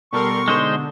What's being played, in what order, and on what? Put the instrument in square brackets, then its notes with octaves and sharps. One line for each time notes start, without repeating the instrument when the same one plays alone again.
[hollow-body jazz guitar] B2 A4 [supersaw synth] G3 A#4 C6 [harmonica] C#6
[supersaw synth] D3 [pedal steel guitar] G#3 D#4 C5